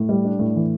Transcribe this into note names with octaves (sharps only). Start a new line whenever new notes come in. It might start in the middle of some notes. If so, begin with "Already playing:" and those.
Already playing: A2
G3
D4
A2
E3